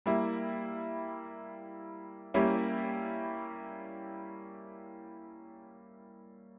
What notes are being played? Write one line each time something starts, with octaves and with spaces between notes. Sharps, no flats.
G3 A#3 E4
G3 A#3 C#4 E4 G4